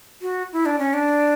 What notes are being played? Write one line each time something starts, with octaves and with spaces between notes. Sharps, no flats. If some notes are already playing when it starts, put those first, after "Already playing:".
F#4
E4
D4
C#4
D4